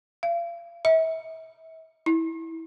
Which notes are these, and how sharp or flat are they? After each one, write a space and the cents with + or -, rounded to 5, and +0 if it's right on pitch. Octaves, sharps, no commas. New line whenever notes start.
F5 -40
E5 -35
E4 -20